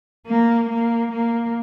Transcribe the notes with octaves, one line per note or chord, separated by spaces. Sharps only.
A#3
A#3
A#3